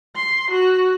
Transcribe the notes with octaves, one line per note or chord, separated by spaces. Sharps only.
C6
F#4